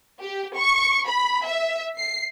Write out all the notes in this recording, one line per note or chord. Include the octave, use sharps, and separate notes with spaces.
G4
C#6
B5
E5
C7